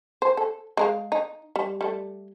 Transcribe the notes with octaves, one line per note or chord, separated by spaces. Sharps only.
C5
A4
G#3 A#4 F5
D#4
G3
G3 A3